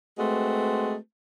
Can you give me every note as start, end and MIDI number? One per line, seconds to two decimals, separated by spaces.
0.19 0.96 56
0.19 0.96 57
0.19 0.96 60
0.19 0.96 66
0.19 0.96 71